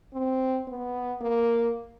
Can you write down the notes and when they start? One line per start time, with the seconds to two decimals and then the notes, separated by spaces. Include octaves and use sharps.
0.14 C4
0.68 B3
1.21 A#3